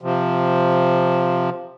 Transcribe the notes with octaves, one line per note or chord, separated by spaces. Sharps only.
C3 F3